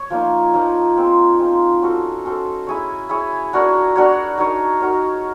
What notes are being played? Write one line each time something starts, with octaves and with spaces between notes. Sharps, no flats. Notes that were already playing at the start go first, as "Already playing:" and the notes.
Already playing: C#5
F3 A#3 D#4
F3 A#3 D#4
G#3 C4 F4
G#3 C4 F4
C#4 F#4 A4 C5
C#4 F#4 A4 C5
E4 G#4 C#5
E4 G#4 C#5
D4 F#4 A#4 C#5
D4 F#4 A#4 C#5
D#4 F#4 A#4 C#5
D#4 F#4 A#4 C#5